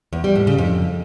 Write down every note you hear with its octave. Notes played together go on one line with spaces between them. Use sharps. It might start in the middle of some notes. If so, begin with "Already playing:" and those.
E2
G3
A2
C#3
F2